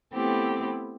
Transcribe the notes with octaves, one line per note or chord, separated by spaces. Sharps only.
A3 B3 C4 E4 G4 A4